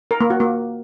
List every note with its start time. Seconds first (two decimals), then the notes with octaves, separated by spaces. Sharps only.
0.11 A#4
0.21 A#3
0.30 F#4
0.40 A#3